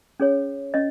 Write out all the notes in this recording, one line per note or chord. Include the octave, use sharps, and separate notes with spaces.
C#4 G#4 C#5
C#4 D#5